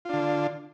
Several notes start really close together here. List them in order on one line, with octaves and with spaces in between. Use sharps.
F4 D4 D3